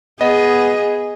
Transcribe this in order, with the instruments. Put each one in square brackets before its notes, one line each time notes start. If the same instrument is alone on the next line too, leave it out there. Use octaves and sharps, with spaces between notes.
[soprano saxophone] B3 [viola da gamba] G#4 [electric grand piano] D#5